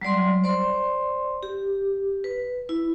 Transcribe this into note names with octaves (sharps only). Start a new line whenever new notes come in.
F#3 G3 D5 C6
C5 D5 C6
G4
B4
E4